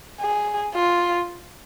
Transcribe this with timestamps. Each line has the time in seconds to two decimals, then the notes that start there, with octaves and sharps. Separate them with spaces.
0.20 G#4
0.74 F4